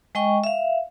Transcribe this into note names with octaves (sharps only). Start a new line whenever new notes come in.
G#3 D#5 G5 C#6
E5 F5